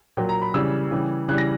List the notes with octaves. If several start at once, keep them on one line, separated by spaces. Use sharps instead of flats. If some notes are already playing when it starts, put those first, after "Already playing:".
A#2 F#3 G5
A#5
B5
C#3 E3 G3 E6
C#3 E3 G3
C#3 E3 G3 F#6
A#6